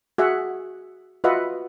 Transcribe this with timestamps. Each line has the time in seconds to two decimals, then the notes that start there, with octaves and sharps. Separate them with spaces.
0.18 F#4 G#4 E5 F#5
1.24 F4 F#4 B4 D#5 E5 F#5